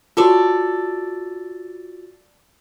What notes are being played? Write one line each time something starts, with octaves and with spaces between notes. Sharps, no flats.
F4 F#4 A4 C#5 D5